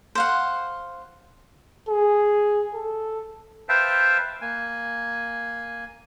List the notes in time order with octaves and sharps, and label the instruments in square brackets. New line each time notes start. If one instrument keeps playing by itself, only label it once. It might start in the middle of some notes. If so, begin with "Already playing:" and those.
[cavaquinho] C5 F5 F#5
[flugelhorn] G#4
A4
[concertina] B4 C5 E5 F5 G5 A5
A#3 G#5